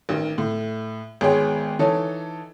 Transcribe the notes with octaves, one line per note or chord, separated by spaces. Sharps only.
A1 D#3
A2
G#1 G#3 B3 G#4 C#5 G5
E3 D#4 A4 C#5